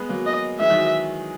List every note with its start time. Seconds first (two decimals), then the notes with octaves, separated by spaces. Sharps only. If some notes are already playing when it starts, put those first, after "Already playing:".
Already playing: G#3 B3
0.09 F#3 A#3
0.26 D#5
0.60 E3 G#3 E5
0.70 D#3 F#3